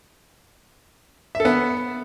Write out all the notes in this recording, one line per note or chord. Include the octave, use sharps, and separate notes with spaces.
E5
A4
B3